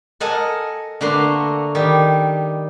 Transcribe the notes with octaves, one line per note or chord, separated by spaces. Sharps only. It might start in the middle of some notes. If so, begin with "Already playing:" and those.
A4 A#4 D#5 F#5 G#5 A5
D3 A3 A#3 F#4 B4 C6
D#3 G3